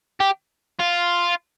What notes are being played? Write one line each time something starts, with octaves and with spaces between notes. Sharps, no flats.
G4
F4